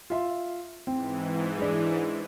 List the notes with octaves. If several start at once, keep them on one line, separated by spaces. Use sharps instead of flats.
F4 E5 C6
G#2 E3 C4
G#3 D4